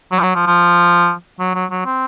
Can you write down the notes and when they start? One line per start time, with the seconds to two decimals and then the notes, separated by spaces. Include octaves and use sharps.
0.12 F#3
0.19 F3
0.23 F#3
0.35 F3
0.47 F3
1.40 F#3
1.55 F#3
1.71 F#3
1.85 C4